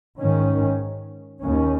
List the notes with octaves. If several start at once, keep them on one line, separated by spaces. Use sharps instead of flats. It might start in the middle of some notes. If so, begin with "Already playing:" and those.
G#2 D#3 C#4
D#2 D#3 C#4